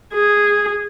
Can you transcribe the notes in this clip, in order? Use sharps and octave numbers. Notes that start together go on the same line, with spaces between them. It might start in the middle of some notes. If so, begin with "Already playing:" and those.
G#4